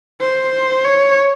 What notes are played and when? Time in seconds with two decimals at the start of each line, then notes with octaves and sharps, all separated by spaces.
0.21 C5
0.84 C#5